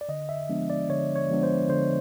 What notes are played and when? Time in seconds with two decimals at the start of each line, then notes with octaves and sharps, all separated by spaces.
0.01 D5
0.09 D3 D#5
0.29 E5
0.49 F3 G#3 B3 D4
0.70 D5
0.89 D3 C#5
1.16 C#5
1.30 F3 G#3 B3 D4
1.43 C5
1.69 D3 C5